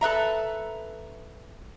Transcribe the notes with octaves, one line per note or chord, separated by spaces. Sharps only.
A4 B4 E5 A#5